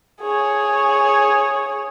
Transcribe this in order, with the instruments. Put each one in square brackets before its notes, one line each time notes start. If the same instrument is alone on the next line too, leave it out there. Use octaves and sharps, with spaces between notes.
[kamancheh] G#4 C#5